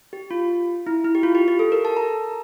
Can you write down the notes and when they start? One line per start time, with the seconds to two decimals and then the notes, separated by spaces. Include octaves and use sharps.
0.13 G4
0.31 F4
0.86 E4
1.04 E4
1.15 G4
1.23 F4
1.35 G4
1.48 G4
1.59 A4
1.72 A#4
1.85 A5
1.97 A#5